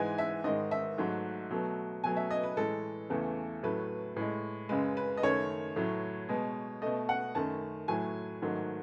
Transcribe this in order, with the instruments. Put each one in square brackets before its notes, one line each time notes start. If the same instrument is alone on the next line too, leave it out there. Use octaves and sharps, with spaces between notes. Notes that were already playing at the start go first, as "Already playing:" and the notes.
Already playing: [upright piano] G#2 E3 G#3 G#5
E5
G#2 D#3 G#3 D#5
E5
G#2 F#3 A3
B2 F#3 A3
B2 F#3 A3 G#5
E5
D#5
B4
A2 E3 G#3 A4
E2 C#3 E3 A3
A2 F#3 A3 B4
A2 G#3
F#2 C#3 G#3 B4
B4
D#5
F#2 D#3 A3 C#5
A2 F#3 A3
B2 G#3
B2 A3 D#5
F#5
F#2 D#3 A3 A5
A2 F#3 A3 G#5
G#2 D#3 F#3 A3